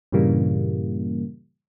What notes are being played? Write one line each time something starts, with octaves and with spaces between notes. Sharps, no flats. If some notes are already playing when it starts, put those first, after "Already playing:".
G2 A#2 C#3 E3 G3 A#3